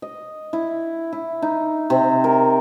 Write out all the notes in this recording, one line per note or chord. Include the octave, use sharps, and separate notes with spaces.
D#5
E4
E4
D#4
C3
A#4